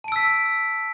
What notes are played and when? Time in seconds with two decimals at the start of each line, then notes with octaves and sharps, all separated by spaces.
0.04 A5
0.08 D7
0.12 E6
0.16 B6